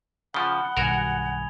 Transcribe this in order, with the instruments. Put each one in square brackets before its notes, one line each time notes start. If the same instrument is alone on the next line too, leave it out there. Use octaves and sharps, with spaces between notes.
[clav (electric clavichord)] C#3 F3 [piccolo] F#5 [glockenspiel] B5 D#6 G7
[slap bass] B1 G2 D#3 [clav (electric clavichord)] F#4 A#4 [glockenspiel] G#5 G#6 F7